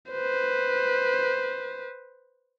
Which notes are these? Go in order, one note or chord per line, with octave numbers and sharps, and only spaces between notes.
B4 C5